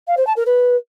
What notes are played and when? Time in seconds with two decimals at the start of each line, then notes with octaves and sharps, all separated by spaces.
0.07 F5
0.17 C5
0.26 A5
0.36 A#4
0.46 B4